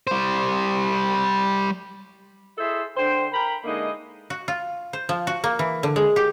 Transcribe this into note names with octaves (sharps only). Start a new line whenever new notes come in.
G3 C5
E4 G#4 A4 C5 D#5 E5
D3 C5 G5
A#4 G5 A#5 B5
D3 G#3 A#3 D#4 E4 D#5
F#4
F4
C5
F3
F#4
A#3
E3
D3
G#3
G4